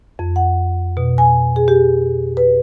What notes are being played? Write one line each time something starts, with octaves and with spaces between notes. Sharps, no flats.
F2
F#5
B2
G#5
G#4
G4
B4